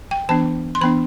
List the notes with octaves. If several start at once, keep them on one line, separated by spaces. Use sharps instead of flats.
G5
E3 B3 D4 A5
C6
E3 B3 D4 B5